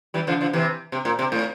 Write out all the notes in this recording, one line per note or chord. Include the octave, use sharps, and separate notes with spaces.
E3 G3
D3 F3
D3 F3
C3 E3
C3
A#2
C3
A2